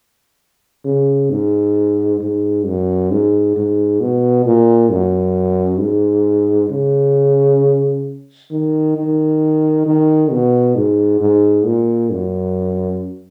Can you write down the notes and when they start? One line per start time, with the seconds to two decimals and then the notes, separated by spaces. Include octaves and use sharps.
0.85 C#3
1.31 G#2
2.21 G#2
2.66 F#2
3.11 G#2
3.56 G#2
4.00 B2
4.46 A#2
4.90 F#2
5.80 G#2
6.70 C#3
8.51 D#3
8.96 D#3
9.86 D#3
10.31 B2
10.76 G#2
11.20 G#2
11.66 A#2
12.11 F#2